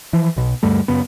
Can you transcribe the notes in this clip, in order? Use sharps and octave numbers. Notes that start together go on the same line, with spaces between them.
E3 F3
B1 B2
D2 G2 G3 A3
F#2 C#3 B3